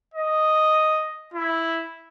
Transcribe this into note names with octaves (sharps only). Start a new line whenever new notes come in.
D#5
E4